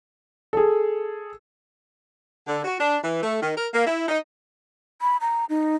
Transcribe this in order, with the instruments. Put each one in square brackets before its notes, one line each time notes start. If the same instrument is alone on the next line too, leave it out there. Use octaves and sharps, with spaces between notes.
[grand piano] G#4 A4
[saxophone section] D3
F#4
D4
E3
A3
D#3
A#4
A#3
E4
D#4
[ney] B5
A#5
D#4